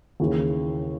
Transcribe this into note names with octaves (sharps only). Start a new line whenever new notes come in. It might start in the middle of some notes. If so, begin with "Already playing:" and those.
D#2 C#3 E3